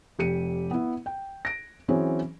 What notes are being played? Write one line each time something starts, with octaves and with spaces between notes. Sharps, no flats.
F1 G4 C#7 D#7
B3 E4
G5
A#6 D7
E3 F#3 C4 C#4 G#4 C#5